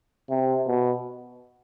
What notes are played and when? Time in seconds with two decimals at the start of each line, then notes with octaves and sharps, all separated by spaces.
0.30 C3
0.67 B2